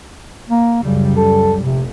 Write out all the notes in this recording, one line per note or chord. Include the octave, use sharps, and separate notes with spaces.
A#3
C#2 F#2 C#3 G3
A4
F1 A#1 F2 C3